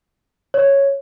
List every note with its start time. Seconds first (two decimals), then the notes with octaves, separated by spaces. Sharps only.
0.54 C#5